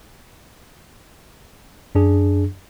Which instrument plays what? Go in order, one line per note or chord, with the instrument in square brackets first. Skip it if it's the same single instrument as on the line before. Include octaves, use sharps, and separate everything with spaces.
[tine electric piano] F#2 D4 G#4